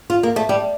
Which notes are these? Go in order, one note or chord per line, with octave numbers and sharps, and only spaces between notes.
F4
A#3
A3
G3